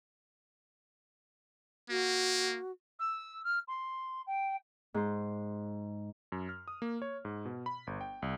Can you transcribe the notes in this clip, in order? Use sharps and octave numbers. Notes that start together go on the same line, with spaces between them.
A#3 F#4
E6
F6
C6
G5
G#2 C5
F#2
F6
D#6
A#3
C#5
G#2
B2
B5
G1
G5
C2